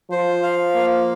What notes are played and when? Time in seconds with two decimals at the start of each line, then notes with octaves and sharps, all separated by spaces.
0.11 F3 C5
0.43 F5
0.74 A#3